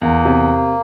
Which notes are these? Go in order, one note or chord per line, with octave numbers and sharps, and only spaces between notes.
E2 A#3
C3